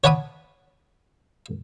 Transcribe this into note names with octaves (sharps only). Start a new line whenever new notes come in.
C#5 F#5 A5 B5 D6 D#6